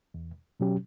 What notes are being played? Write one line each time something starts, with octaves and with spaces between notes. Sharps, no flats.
E2
B2 F#3 C#4 G4